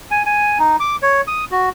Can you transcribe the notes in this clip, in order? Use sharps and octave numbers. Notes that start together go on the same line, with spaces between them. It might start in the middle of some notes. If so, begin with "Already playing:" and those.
G#5
G#5
D#4
D6
C#5
D#6
F#4